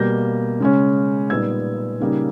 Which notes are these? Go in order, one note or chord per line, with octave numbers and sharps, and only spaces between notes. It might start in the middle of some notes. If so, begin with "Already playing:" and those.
Already playing: B2 G3 A#3 G6 A#6
C#3 G#3 C#4
A#2 G3 B3 D#4 E6 G#6
C#3 G3 A#3 D#4